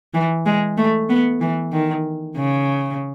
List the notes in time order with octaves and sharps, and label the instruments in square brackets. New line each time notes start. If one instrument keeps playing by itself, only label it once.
[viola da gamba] E3
G#3
A3
B3
E3
D#3
C#3